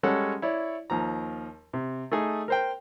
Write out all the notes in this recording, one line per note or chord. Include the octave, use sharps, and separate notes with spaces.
G3 G#3 C#4 A4 C#5 F#5
E4 C#5 D5
D#2 F3 A#5
C3
A3 D#4 G#4
A#4 C5 G5